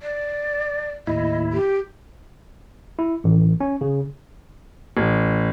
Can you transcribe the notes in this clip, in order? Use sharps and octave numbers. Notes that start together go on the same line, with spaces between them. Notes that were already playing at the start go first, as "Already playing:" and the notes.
D5
D#2 A2 E4 D#5
G4
E4
A1
C#4
C#3
A1